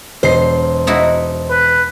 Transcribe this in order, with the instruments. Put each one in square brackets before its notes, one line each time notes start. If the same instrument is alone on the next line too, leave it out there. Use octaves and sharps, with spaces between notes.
[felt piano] E1 D#5 C7 [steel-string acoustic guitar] C5
[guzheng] D#4 E4 F#4
[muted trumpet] B4